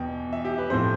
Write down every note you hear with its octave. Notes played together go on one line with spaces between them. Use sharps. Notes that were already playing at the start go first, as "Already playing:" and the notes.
Already playing: E2 B2 G5
E5
G4
B4
A2 F3 C4 C5